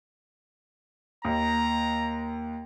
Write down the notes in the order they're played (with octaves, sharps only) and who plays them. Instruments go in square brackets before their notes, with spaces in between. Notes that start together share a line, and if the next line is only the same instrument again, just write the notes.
[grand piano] D#2 [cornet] A#5